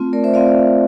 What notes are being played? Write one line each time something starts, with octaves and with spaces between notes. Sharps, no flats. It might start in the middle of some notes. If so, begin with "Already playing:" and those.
Already playing: A3 C4 F4
A3 A#4 D5
C5 E5
C4 F4 D5 F5